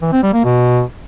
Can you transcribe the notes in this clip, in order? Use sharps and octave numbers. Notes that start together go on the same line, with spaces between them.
E3
C4
G3
A#3
B2